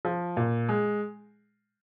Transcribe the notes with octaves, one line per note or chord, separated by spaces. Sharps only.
F3
A#2
G#3